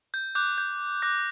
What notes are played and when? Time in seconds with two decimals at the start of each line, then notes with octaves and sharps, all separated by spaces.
0.14 G6
0.35 D6 F#6 G6
0.58 G6
1.02 D6 F#6 A#6